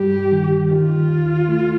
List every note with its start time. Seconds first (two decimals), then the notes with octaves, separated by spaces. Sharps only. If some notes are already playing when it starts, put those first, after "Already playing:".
Already playing: G2 G3 G4
0.32 D#3
0.71 D#3 F4
1.10 D#2
1.49 A3